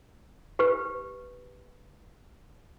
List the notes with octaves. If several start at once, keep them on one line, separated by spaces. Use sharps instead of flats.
G4 B4